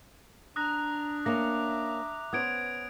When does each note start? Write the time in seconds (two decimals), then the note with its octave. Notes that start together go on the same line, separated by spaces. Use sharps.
0.56 D4 A#5 D#6 F#6 A#6
1.26 A#3 C#4 E5 A#5 D6 A#6 F7
2.33 B3 C#4 C5 D#6 G#6 D7